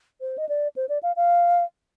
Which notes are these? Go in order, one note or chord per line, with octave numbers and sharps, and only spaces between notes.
C5
D#5
D5
C5
D5
F5
F5